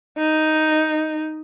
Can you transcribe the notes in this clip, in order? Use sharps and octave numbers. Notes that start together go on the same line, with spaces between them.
D#4